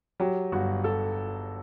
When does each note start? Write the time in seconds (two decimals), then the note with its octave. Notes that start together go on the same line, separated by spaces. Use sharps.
0.20 F#3 G4
0.52 G1 F#4
0.84 A4